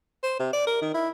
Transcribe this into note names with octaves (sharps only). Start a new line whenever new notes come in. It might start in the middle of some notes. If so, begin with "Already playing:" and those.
C5
C3
D5
A#4
D#3
E4